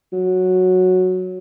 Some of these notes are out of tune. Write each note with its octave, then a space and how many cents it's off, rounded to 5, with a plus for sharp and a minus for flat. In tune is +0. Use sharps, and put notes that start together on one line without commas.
F#3 -5